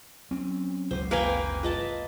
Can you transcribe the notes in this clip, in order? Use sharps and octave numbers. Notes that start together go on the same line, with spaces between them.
F#3 C4 C#4
F#1 C#2 C3 C5
A#3 A#4 B4 F5 G5 G#5
F4 B4 D#5 A5